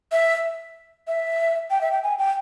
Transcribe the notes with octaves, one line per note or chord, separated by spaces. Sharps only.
E5
E5
G5
E5
G5
G#5
G5